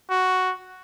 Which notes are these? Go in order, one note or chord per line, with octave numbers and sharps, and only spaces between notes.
F#4